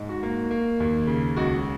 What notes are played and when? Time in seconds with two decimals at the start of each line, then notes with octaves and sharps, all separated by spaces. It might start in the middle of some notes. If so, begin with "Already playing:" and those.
Already playing: G#2
0.09 F#4
0.23 A#3
0.51 A#3
0.80 D#2
1.07 C#3
1.37 C#2 F#4